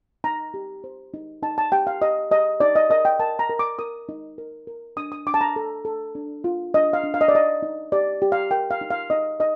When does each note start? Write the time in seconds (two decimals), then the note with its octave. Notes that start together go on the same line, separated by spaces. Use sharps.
0.24 D#4 A#5
0.54 G4
0.84 C5
1.14 D#4
1.43 D#4 A5
1.58 A5
1.72 G4 G5
1.87 F5
2.02 G4 D#5
2.31 G4 D#5
2.60 D#4 D5
2.75 D#5
2.90 A#4 D#5
3.05 G5
3.19 A#4 A5
3.39 A#5
3.49 A#4
3.59 D6
3.79 A#4 D#6
4.09 D#4
4.38 A#4
4.67 A#4
4.97 D4 D#6
5.12 D#6
5.26 D4 D6
5.34 A5
5.41 A#5
5.56 A4
5.85 A4
6.15 D4
6.44 F4
6.74 D4 D#5
6.93 F5
7.03 D4
7.14 F5
7.21 D#5
7.28 D5
7.33 D#4 D#5
7.63 D#4
7.92 G4 D5
8.22 G4
8.32 F5
8.51 A#4 G5
8.71 F5
8.81 D#4
8.90 F5
9.10 D#4 D#5
9.40 D#4 D#5